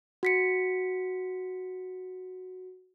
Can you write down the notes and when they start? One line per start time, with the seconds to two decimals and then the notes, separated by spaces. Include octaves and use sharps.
0.23 F#4 B6 C#7